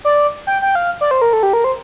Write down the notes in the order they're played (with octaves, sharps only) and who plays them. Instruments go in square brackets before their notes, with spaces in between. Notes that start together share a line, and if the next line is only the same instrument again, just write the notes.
[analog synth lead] D5
G5
G5
F5
D5
C5
A#4
A4
G4
A#4
C5